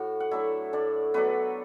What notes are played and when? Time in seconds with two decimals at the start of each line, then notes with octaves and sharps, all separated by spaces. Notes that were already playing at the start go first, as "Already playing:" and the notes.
Already playing: A2 F#4
0.20 F#5
0.31 F#3 A3 D4 E4 E5
0.73 A2 D4 D5
1.14 F#3 A3 B3 D4 B4